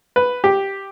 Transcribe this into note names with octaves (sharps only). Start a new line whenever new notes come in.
B4
G4